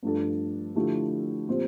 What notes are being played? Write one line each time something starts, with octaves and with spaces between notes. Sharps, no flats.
G2 F3 A3 D4 A4
D3 F3 A3 E4 G4
A#2 F3 C4 G4 C5